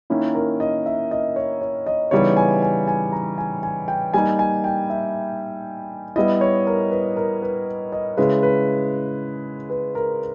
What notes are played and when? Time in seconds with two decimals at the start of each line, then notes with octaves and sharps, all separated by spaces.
0.10 D#3 A#3 C#4 E4
0.35 A#4
0.60 D#5
0.86 E5
1.11 D#5
1.36 C#5
1.61 C#5
1.86 D#5
2.11 C#3 E3 G3 B3 D#4 C#5
2.37 G#5
2.62 G#5
2.88 G#5
3.12 A#5
3.38 G#5
3.63 G#5
3.88 G5
4.14 G3 A#3 D#4 G#5
4.39 G#5
4.64 G5
4.90 E5
6.16 G3 B3 E4 D#5
6.41 C#5
6.67 A#4
6.91 B4
7.16 A#4
7.42 B4
7.92 D#5
8.17 C#3 G#3 C#4 E4 B4
8.43 B4
9.70 B4
9.95 A#4